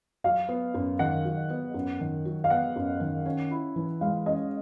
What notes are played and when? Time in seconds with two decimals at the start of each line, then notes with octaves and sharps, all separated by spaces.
0.24 F#3 F5
0.49 B3
0.74 F#2
0.99 D#3 F#5
1.25 F#3
1.50 B3
1.74 F#2
2.00 D#3
2.25 F#3
2.44 F5
2.50 B3 F#5
2.76 F#2
3.00 D#3
3.26 C#4
3.51 E4
3.76 E3
4.01 G#3 F5
4.26 C#4 D#5